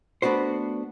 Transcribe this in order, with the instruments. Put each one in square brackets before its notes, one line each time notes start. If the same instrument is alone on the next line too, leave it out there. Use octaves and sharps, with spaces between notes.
[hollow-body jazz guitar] A3 B3 D4 F#4 C5